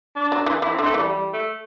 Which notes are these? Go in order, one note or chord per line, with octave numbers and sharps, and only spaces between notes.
D4
F#3
E3
E3 E4
C4
D3
A3
E3 G3
G3
A3